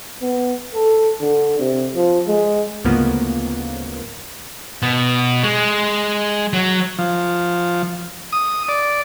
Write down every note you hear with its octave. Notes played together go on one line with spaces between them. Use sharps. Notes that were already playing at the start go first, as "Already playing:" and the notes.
B3
A4
D3
C3
F3
G#3
D2 G#2 C#3 F3 A#3 B3
B2
G#3
F#3
F3
D#6
D5